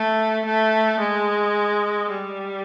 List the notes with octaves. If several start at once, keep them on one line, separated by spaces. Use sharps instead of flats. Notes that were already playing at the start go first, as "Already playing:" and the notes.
Already playing: A3
A3
G#3
G3